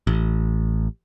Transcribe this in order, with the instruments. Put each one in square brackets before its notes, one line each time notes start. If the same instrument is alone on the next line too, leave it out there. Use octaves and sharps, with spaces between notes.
[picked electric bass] A1